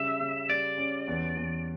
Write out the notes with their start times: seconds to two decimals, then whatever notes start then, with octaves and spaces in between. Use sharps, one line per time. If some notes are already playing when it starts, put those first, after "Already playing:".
Already playing: C#3 G3 E5
0.20 C#3
0.49 G3 D5
0.78 C#4
1.08 E2
1.37 E2